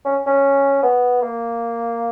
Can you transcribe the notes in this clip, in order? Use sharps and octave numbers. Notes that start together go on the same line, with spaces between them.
C#4
C#4
B3
A#3